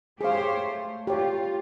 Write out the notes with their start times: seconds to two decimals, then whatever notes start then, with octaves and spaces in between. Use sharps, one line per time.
0.21 G4 G#4 C5 C#5 F5
0.61 A3
1.07 F4 G4 C#5